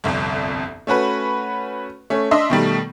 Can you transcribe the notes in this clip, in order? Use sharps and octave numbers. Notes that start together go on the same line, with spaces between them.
G1 C2 F2
A3 C#4 F#4 B4
A3 C#4
D4 D#5 E5 C6
B2 D#3 G3 A3